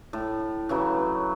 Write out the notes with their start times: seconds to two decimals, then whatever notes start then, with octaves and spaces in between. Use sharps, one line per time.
0.13 A2
0.69 C#3 E3 F#3